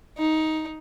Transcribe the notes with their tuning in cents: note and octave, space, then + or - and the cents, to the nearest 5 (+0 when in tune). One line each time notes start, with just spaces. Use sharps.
D#4 +10